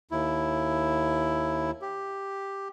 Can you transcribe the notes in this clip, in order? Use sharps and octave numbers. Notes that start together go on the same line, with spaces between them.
D#2 E4
G4